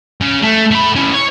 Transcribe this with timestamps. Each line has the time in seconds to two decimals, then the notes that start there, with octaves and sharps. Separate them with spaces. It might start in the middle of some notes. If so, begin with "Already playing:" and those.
0.21 C#3
0.42 A3
0.71 A3 B5
0.96 C#4 E4
1.14 C#5